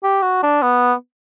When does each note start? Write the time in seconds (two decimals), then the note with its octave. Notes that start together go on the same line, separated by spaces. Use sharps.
0.04 G4
0.23 F#4
0.43 D4
0.63 B3